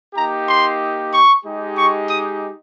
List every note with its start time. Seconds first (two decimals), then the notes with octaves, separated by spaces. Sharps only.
0.15 A#3 D#4 G4 A#5
0.47 C6
1.13 C#6
1.45 G#3 D#4 G4
1.78 C#6
2.09 D#6